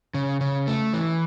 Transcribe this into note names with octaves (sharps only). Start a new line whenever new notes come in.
C#3
C#3
A3
E3